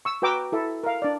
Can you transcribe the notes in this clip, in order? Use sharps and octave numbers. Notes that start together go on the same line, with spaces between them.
C#6 E6
F#4 B4 G5 A#5 D6 E6
E4 A4 E5
A#4 F5
D4 D5